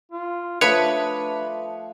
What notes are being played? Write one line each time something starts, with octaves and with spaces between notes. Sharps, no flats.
F4
F3 A3 D4 B4 C#5 B5 D#6